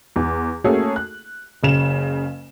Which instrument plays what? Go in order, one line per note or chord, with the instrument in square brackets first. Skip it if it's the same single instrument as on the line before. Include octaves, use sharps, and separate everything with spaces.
[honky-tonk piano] E2
A3 A#3 C#4 F#4 G#4 A4
F#6
F#1 C#3 E7